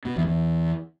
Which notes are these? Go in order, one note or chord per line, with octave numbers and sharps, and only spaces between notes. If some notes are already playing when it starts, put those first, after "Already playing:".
B2
E2
E2